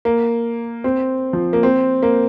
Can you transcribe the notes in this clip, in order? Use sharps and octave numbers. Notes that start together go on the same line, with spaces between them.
A#3
C4
F3
A#3
C4
A#3